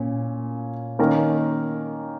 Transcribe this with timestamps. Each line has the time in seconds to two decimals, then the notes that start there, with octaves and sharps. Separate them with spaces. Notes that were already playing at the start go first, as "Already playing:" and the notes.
Already playing: A#2 C#4
0.99 D#3 A#3 C#4 A#4